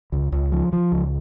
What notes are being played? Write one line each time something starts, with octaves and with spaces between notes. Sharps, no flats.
C#2
C#2
F3
F3
C#2